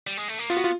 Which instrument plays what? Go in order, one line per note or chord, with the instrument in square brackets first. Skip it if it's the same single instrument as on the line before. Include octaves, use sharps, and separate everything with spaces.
[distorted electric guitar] G3
G#3
A3
A#3
[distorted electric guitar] B3 [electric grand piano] F4
[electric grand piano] F#4
F4